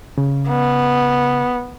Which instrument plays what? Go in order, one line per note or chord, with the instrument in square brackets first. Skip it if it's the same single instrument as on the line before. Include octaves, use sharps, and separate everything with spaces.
[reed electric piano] C#3
[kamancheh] B3